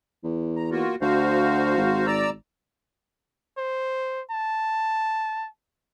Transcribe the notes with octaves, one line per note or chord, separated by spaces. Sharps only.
E2
A#5
A#3 F4 F#4
D2 F#4 C5 F5
G#1
D5 A#5 E6
C5
A5